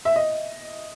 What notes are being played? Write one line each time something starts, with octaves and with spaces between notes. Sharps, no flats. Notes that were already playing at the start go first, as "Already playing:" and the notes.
E5
D#5